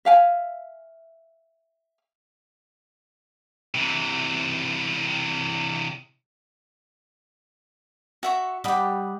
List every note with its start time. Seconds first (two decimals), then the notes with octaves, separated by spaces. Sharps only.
0.05 E5 F5 G5 G#5
3.75 C3 E3
8.23 F#4 E5 C#6
8.64 G3 G4 D#5 F#5 B5